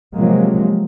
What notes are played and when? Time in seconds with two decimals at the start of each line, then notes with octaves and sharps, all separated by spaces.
0.14 C3 F3 F#3 G#3 A#3